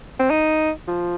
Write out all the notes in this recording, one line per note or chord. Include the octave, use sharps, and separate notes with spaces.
C4
D#4
F3